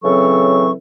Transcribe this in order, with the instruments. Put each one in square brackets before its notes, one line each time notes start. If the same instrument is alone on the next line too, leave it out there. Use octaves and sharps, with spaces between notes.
[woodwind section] C#3 E3 F#3 C4 A4 C#6